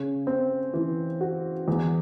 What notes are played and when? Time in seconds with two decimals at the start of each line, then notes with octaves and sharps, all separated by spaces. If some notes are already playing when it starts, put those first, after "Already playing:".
Already playing: C#3
0.27 C4
0.74 E3
1.21 F#4
1.68 E2